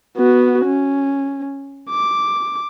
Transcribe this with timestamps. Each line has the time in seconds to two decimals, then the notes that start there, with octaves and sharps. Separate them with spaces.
0.17 B3 F#4
0.66 C#4
1.90 D6